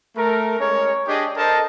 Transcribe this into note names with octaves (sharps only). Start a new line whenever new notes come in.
A3 A#4
G#3 C#4 A#4 C#5
D4 G4 G#4 D#5
A4 A#4 C5 D#5 A5